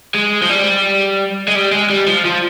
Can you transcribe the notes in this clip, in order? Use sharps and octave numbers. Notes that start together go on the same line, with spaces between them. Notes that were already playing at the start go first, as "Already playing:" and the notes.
G#3
F3
G3
G#3
G3
G#3
G3
F3
F3